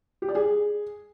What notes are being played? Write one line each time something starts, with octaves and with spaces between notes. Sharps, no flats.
G4
D5
G#4